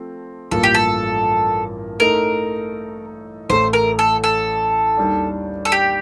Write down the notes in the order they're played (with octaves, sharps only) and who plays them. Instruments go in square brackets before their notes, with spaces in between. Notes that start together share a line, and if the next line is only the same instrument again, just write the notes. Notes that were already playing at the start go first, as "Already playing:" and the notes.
Already playing: [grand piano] F3 A3 C4
[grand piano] A1 G2 F3 A#3 [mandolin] A4
[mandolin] G4
A4
[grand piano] A2 A3 D#4 A4 [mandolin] A#4
[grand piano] A1 A2 A3 [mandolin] C5
[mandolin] A#4
A4
A4
[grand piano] D#2 D#3 G3 D4
[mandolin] A4
G4